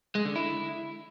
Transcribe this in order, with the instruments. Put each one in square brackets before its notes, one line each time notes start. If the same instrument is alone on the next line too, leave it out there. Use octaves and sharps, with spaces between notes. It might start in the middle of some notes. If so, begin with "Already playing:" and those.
[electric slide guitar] G#3
D3
E4